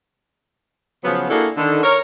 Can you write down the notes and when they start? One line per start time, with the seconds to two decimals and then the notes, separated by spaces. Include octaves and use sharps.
1.04 C#3 F3 F#3 B3
1.30 A#3 D4 E4 F#4 G#4 A4
1.57 D3 D#3
1.83 A#4 C#5